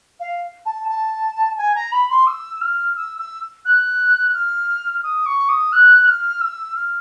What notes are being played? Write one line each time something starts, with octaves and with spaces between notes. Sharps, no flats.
F5
A5
A5
G#5
A#5
B5
C6
E6
F6
E6
E6
F#6
F6
D#6
C#6
D#6
F#6
F6
E6
F6